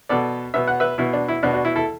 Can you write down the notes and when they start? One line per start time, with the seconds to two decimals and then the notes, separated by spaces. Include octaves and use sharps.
0.09 B2 B3 A4 D5
0.54 B2 B3 E5
0.68 F#5
0.80 B4 E5
0.98 B2 B3 E4
1.13 D4
1.28 E4
1.43 B2 B3 D4 F#4
1.53 D4 F#4
1.65 E4
1.76 E4 A4